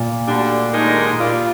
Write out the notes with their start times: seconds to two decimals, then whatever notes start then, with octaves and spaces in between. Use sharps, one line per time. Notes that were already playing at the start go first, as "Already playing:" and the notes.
Already playing: A#2
0.28 D2 D3 G3 D4
0.74 D#2 D3 G#3 D#4 A#4
1.20 A#2 G3 D4 F4